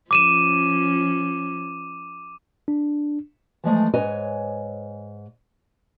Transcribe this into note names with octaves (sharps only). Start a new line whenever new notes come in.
F3 C#4 D6 D#7 E7
D4
E3 F3 G#3 A3
G#2 B4 C#5 D#5 G#5